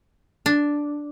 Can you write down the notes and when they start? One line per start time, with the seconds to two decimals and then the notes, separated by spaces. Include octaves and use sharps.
0.46 D4